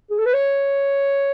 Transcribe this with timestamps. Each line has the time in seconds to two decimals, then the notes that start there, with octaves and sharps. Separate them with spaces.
0.10 G#4
0.18 A4
0.26 B4
0.34 C#5